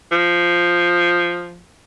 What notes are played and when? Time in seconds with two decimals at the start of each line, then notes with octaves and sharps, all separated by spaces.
0.12 F3